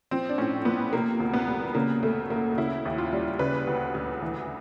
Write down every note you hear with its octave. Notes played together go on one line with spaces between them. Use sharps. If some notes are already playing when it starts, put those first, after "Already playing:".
F3 C4
D4
A2 C#4
F3 B3
C3 A#3
D2
B3
G3
C#3 A#3
D2 A3
D2 A#3
C#3 E4
D#2
F4
G3
C#3 B4
D2
D2
E3